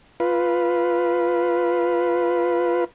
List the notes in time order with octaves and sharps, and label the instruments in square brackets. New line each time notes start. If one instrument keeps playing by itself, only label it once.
[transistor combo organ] F4 B4